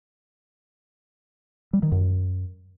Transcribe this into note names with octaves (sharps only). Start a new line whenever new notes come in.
G3
D#3
F#2